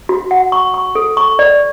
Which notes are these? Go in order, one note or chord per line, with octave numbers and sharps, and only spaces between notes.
F#4
F#5
C#6
C#6
A4
C#6
D5